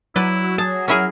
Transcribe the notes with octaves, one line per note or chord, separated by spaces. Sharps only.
F#3 E4 B4 D5
G#4 A5
C#4 E4 G#4 A#4